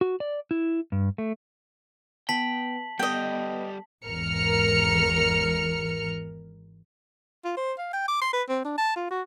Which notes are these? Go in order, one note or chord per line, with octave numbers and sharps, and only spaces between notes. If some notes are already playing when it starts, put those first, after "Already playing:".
F#4
D5
E4
G2
A3
B3 G5 A5 B6 F#7
G3 B3 A4 D#5 G5
G#1 E2 A#4 F6 C#7
F4
C5
F5
G5
D6
C6
B4
C4
D4
A5
F4
F#4